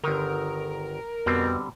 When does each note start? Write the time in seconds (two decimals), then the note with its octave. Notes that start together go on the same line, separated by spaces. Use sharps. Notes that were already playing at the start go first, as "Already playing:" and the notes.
0.04 G1 D3 D#3 A#4
1.26 F2 B2 D3 G3 C4